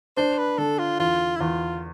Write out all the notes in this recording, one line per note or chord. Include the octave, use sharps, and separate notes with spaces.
D4 C5
B4
D3 A4
F4
E2 F4
E4
E2 F4